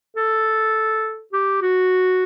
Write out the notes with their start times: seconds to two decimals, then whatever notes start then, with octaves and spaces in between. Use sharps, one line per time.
0.17 A4
1.33 G4
1.62 F#4